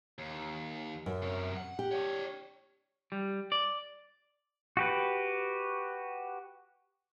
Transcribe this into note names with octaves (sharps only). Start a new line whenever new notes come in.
D#2
F#2
C3 C#4
F#5
G4
D4 C#5
G3
D5
F#4 G4 B4